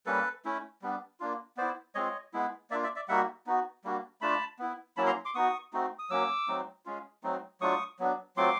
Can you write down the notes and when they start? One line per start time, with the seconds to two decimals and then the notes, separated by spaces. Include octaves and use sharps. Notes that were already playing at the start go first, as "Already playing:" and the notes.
0.06 G3 A#3 C#4 A4 B4
0.45 A3 C#4 E4
0.82 G3 B3 D4
1.20 A#3 D4 F4
1.57 B3 E4 C5 D5
1.95 G#3 C4 F4 C#5 D#5
2.33 G#3 B3 E4
2.70 A#3 D4 F4 D5 E5
2.83 D5 E5
2.96 D5 E5
3.08 G3 A#3 D#4 F#4 E5 F#5
3.46 B3 D#4 F#4
3.84 G3 A#3 D4 F#4
4.21 A3 D4 F4 A5 B5
4.59 B3 E4
4.97 F#3 A#3 C#4 E4 A5 B5
5.06 A#5 C6
5.25 C6 D6
5.34 B3 D#4 F#4 C#6 D#6
5.73 A3 C4 D#4 F#4
5.99 D#6
6.10 F#3 A#3 C#4 D6 E6
6.48 F#3 A3 C4 D#4
6.86 G#3 C#4 F4
7.23 F#3 A3 C4 D#4
7.61 F#3 A3 D4 F4 C#6 D#6
7.99 F#3 B3 D4
8.36 F#3 A3 C4 F4 C6 D6